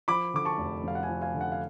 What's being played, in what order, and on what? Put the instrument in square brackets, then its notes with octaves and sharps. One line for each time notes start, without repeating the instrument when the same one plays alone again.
[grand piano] F3 B5 D6
D3 D6
A5 C#6
F1
F2 F5
F#5
F5 G#5
F3
F5 G#5
D3
F#5
F5